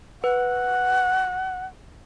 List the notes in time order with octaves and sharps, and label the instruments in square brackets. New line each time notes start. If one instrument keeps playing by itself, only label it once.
[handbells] B4 [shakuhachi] F#5